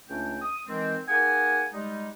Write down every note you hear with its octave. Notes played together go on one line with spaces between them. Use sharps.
C#2 A3 C#4 D4 G5
D#6
D#3 E3 G#3 C4
A#3 D#4 G#4 F#5 G#5
G3 G#3 D#4